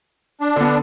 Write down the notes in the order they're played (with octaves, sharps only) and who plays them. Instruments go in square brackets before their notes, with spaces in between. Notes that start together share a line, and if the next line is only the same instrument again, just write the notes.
[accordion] D4
[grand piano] D3 B3